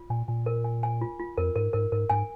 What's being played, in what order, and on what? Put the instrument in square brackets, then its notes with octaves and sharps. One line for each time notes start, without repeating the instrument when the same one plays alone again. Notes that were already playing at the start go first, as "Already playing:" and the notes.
Already playing: [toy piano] F4
[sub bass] A#2 [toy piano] G#5
[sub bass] A#2 [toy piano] G#5
[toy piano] A#4
G#5
G#5
F4
F4
[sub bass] F2 [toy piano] A#4
[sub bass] G#2 [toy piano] A#4
[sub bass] G#2 [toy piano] A#4
[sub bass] G#2 [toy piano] A#4
[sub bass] G#2 [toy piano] G#5